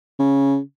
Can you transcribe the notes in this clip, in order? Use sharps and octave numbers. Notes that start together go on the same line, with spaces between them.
C#3